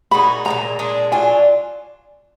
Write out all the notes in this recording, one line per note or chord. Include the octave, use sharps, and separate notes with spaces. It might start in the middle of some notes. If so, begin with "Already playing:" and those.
A#2 G#3 D#4 F#4 B5
F3 G#3 A#5
A#2
A#2 G#3 D4 G#4
F#3 D4 F4 G#5